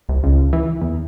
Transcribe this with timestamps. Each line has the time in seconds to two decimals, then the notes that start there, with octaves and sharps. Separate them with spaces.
0.09 C2
0.23 C#2
0.53 E3
0.81 E2